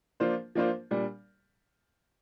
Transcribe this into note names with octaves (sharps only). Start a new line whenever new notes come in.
F3 A#3 D4 F4 C5
F3 A#3 D4 F4 C5
A#2 G3 D4